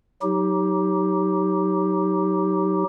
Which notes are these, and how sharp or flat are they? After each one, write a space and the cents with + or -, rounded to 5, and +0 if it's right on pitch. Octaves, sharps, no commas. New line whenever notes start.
F#3 +0 D#4 +30 G4 +0